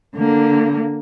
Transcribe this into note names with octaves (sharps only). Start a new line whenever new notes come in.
D3 A#3